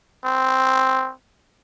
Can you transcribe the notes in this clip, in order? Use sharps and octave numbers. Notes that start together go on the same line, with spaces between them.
C4